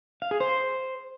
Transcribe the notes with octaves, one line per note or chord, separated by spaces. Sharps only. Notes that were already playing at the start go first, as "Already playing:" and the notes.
F5
G#4
C5